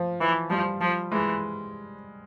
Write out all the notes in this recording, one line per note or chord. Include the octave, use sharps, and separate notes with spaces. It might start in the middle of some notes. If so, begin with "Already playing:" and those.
Already playing: F3
E3
F3 G3
F3
E3 G#3